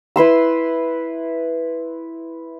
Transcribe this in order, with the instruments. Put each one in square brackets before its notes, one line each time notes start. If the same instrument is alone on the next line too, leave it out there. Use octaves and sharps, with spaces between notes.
[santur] E4 B4 C6 E6